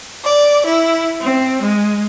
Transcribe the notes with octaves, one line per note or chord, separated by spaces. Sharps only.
D5
E4
C4
G#3